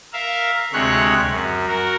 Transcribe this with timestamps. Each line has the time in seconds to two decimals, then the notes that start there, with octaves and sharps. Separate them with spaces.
0.13 A#4 E5 F5
0.73 D2 C3 G#3 C#5 F#6
1.30 F#2
1.68 F#4 A#4